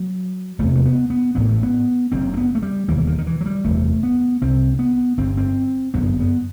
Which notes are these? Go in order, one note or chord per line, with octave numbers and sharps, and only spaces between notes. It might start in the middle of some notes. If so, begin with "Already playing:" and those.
Already playing: F#3
E1 E2 C3 A3
A3
B3
B3
A1 A2 B3
A3
B3
F#1 F#2 C4
C4
B3
A3
G3
E1 D#2 E3
E3
D#3
D#3
E3
F#3
G3
F#1 E2 C3 A3
B3
C2 C3 C4
B3
G1 G2 C4
C4
G1 F#2 B3
B3